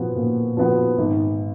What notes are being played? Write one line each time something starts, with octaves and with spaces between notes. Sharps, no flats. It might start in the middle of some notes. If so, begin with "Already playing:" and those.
Already playing: A#2 F3 B3 F#4
A#2
F3 B3 F#4
G#1